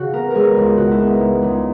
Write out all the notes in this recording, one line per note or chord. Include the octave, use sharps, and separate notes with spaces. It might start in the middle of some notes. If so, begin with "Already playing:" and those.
Already playing: C#3 F#4
B3 A#4
G#3 G#4 A#4
C#2
C#3 F#4
E4
B3
D#4
G#3
C#2